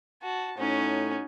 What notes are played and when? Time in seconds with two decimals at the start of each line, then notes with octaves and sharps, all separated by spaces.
0.22 F#4 A5
0.58 A2 C#4 D#4 F#4